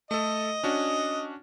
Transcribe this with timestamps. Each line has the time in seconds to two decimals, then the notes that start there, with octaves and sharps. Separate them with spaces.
0.11 A3 A4 D#5
0.63 C#4 D4 F#4